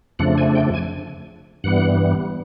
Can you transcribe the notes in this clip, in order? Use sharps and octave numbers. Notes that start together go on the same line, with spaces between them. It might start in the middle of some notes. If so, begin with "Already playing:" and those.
F2 C#3 F3 A3 D4 F#5
G#5
G5
G#5
G2 E3 G3 B3 F#5